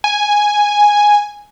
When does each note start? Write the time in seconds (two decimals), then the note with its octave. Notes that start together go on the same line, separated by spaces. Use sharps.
0.04 G#5